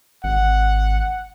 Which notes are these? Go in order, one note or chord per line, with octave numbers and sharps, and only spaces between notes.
G#1 F#5